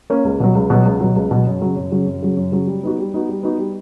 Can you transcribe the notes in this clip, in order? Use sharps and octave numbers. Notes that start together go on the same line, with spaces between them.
A#3 C#4
C#2
B2 F#3
C#2
B2 F#3
C#2
B2 F#3
C#2
B2 F#3
F#2
C#3 F#3
F#2
C#3 F#3
F#2
C#3 F#3
F#2
C#3 F#3
G3
B3 D#4 F#4
G3
B3 D#4 F#4
G3
B3 D#4 F#4
G3